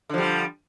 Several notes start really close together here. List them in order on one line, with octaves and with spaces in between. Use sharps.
D3 F3 G3